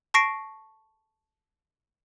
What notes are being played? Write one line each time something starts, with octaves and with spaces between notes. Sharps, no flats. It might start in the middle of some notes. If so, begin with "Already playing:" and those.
A5 C#6 A#6 C7 D7